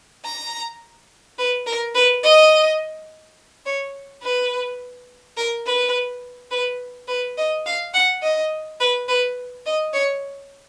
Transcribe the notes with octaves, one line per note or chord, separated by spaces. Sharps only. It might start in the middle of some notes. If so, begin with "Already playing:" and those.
A#5
B4
A#4
B4
D#5
C#5
B4
A#4
B4
B4
B4
D#5
F5
F#5
D#5
B4
B4
D#5
C#5